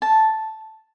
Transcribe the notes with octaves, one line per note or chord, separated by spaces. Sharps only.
A5